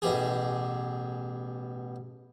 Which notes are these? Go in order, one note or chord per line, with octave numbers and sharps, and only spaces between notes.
A1 B2 G4 G#4